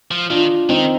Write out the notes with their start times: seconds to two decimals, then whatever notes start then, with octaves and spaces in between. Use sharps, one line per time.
0.11 F3
0.30 D#3 D4 F4
0.69 D#3 C4 D#4